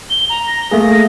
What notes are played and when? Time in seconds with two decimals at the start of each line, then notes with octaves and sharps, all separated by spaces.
0.10 G7
0.29 A#5
0.47 A#6
0.71 A3 A#3 G#4